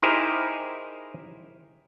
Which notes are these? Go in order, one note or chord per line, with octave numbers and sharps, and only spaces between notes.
D#4 E4 G4 G#4 A#4 C5